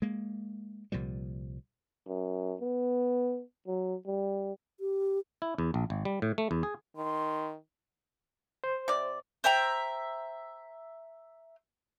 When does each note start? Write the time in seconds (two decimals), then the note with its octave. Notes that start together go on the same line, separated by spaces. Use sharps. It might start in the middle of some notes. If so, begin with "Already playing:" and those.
0.02 G#3 A#3
0.92 C2 A#2 F3 G3
2.07 F#2
2.61 B3
3.67 F#3
4.07 G3
4.80 G4
5.42 E4
5.58 E2
5.74 A#1
5.90 G#1
6.05 G3
6.22 A2
6.38 A3
6.51 E2
6.63 G#4
6.97 D#3 C6
8.64 C5
8.88 C3 D5
9.44 C5 E5 G5 A#5